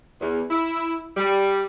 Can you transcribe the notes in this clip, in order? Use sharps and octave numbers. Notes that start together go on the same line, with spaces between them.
E2
E4
G3